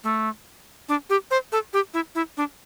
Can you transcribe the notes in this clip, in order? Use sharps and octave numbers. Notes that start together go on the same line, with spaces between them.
A3
D4
G4
C5
A4
G4
E4
E4
D4